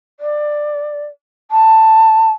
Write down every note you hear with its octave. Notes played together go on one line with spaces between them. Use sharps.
D5
A5